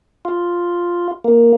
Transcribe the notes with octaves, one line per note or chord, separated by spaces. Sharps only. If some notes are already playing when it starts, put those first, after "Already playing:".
F4
A#3